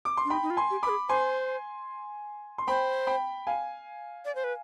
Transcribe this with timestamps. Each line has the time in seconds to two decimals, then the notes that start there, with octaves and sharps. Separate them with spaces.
0.05 D6
0.17 C6
0.25 D4
0.30 D#4 G5 B5
0.43 D#4
0.50 F4
0.57 G#5 C6
0.71 G4
0.83 B4 B5 D6
0.89 G#4
1.09 C5 G#5 C6
2.58 C6
2.67 C5 G5 B5
3.07 G5 B5
3.47 F5 G#5
4.25 D5
4.35 C5
4.44 B4